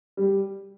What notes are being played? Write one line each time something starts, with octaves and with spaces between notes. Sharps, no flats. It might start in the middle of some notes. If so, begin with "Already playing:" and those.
G3